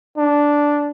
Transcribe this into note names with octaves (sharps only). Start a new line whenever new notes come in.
D4